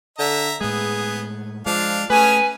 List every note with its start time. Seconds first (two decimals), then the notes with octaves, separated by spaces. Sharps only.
0.19 D3 E5 A#5
0.61 A2 G#3 B3 G#4
1.66 F3 G#3 D4 F5
2.10 A3 C#4 G#4 B4 G#5